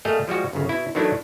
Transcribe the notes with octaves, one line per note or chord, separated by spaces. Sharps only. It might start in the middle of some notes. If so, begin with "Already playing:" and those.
G3 A3 A#3 G#4 D#5 F5
F3 G3 G#3 F#4
G1 F#2 C#3
B2 E4
D#3 E3 F#3 A3 D4 E4